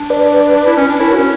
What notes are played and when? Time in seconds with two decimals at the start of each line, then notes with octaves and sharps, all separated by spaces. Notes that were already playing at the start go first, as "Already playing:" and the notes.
Already playing: D4
0.10 B4 D5
0.56 D4
0.66 E4
0.77 C#4
0.89 D4
1.00 E4 A#4 C#5
1.12 C#4 F#4